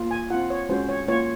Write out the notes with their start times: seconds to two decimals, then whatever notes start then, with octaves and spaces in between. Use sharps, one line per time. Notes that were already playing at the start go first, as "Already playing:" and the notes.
Already playing: A#3 F4
0.11 G#5
0.30 F4 F#5
0.34 C4
0.50 C#5
0.69 G#3 C#4 F#4 C5
0.89 C#5
1.08 A#3 F4 C#5